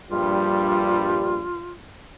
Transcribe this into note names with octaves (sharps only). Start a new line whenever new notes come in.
A#1 G2 G3 F4